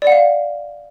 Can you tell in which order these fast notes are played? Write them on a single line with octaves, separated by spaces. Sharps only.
D5 F#5 F5